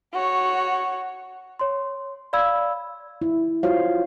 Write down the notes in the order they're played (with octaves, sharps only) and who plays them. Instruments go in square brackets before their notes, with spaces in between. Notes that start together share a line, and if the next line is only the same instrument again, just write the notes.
[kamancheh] F#4 C#5
[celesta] C#5 C6
D5 F5 B5 E6 G#6
[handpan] E4
F4 F#4 C5 C#5 F5